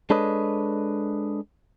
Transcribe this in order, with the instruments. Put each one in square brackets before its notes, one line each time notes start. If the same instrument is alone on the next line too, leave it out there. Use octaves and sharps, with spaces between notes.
[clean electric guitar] G#3 D4 A4 B4 C#5 D#5